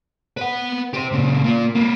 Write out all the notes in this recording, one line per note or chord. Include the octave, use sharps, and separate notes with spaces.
B4 F#5
G4 C5
A#2 C#3
A#3 F4
A#3 B4